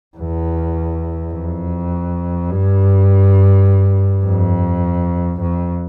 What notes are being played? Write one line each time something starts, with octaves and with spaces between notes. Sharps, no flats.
E2
F2
G2
F2
F2